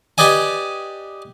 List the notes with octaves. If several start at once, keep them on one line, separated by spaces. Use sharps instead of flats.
G4 B4 D5 D#5 G#5